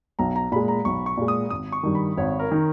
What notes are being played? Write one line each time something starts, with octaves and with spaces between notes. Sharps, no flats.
B1 A#5
A#5
A#2 G#3 B5
A#5
B1 C#6
C#6
A#2 G#3
D#6
G#1 D#6
C#6
G2 D#3
B5
G#1 C#5
A#4
D#3